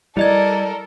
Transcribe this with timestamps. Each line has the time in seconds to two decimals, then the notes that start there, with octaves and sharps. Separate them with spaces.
0.17 G3 E4 A4 A#4 D5 D#5 G#6